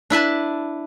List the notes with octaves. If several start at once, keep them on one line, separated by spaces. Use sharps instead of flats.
D4 E4 B4 A5